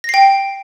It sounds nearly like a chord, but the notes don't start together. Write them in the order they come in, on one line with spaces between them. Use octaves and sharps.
A#6 C7 G5